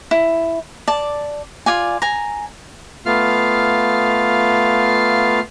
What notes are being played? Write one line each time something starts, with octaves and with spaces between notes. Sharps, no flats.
E4
D5 A5
F4 D5 G#5
G#5 A#5
A3 B3 F4 F5 F6